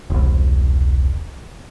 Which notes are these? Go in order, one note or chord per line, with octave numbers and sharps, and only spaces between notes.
E1 C2